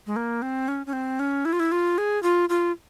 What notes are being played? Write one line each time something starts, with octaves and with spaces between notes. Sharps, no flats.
G#3
A#3
C4
C#4
C#4
C4
C#4
E4
F4
E4
F4
G#4
F4
F4